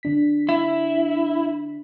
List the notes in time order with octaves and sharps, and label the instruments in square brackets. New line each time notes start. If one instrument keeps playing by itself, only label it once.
[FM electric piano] D3 D4 B6
[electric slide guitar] E4